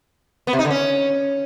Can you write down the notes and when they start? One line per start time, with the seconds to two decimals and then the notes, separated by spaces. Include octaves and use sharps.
0.47 B3
0.53 C3
0.59 D#4
0.65 D3
0.71 C#4